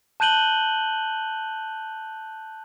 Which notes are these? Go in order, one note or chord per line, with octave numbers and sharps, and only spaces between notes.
A5 F#6 G6 D#7 F#7 G7